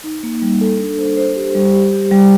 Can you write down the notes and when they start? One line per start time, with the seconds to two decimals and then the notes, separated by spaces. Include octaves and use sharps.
0.04 D#4
0.23 A#3
0.42 G3
0.61 A4
0.80 D4
0.98 C5
1.17 C5
1.36 G4
1.55 G3
1.73 G4
1.92 G4
2.11 G3